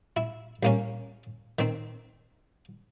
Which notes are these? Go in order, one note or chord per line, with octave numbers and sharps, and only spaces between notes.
E4
C2 A#3 C#4
D#3 C4